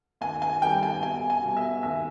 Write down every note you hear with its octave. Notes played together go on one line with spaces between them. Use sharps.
D#2 G#5
G#5
D#3 G3 G5
G#5
B1 G#5
G#5
B2 G3
E5
D#2 E5